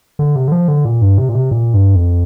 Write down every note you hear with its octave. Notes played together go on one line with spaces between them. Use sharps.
D3
C3
D3
F3
D3
A#2
G2
C3
A#2
C3
A#2
G2
F2